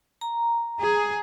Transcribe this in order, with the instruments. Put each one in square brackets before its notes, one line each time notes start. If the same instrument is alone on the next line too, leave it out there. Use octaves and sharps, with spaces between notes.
[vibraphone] A#5
[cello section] G#4